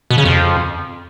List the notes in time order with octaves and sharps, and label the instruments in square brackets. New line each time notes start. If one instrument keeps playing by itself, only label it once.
[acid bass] B2
C#3
F2